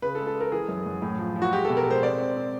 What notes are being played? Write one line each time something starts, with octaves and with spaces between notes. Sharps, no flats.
C#3 B4
A4
G#3
A4
G#3
A#4
E3 G#4
F#2
F#2
A2
F3
F3
F#4
G#3 G4
B2 A4
A#4
G#3 C5
C4 D5
C4
C4